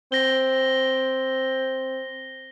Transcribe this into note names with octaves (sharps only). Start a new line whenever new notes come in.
C4 A#6 G7